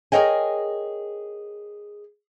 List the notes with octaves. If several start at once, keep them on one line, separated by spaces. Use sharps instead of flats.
G#4 A#4 C#5 D#5 G5 G#5